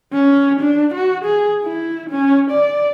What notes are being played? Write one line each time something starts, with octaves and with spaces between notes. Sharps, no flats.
C#4
D4
F#4
G#4
E4
C#4
D5